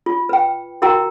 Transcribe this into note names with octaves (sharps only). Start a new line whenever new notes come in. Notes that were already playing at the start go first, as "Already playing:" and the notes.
F4
B4 G5
E4 F#4 A#4 G5 A#5